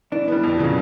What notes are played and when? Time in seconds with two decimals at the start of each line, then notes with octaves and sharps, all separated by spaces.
0.12 E3 D4
0.28 G3 B3
0.44 F2
0.59 C#3 F#3